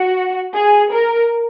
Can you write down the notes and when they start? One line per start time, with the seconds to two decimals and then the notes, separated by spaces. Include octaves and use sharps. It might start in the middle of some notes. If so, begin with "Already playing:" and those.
Already playing: F#4
0.56 G#4
0.93 A#4